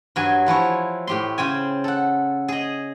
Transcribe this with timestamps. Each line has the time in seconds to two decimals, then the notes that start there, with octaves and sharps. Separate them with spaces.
0.16 G2 F#3 G#5
0.46 E3 F3 E4 C#5
1.07 A2 G4 C6
1.38 C#3 C5 G5 G#5
1.84 A4 F#5
2.48 G#4 D#5